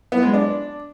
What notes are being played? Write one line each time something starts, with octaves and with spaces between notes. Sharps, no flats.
B3
G#3
D4